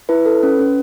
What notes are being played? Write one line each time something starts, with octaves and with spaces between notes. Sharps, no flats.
E4 B4
A4
C#4
C#4